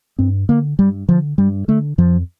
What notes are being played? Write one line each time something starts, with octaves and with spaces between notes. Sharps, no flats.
G2 C4
D3 A#3
G2 G3
D3 F3
G2 G3
D3 A3
F2 F3